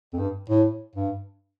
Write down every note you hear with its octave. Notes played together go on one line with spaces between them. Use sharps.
F2
G2
A2
G2